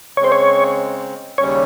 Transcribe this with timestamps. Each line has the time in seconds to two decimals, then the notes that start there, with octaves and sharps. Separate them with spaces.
0.17 C#3 C#5
0.20 G#3 C4 C5
0.32 C#5
1.38 D#2 C#3 G3 C#4 C#5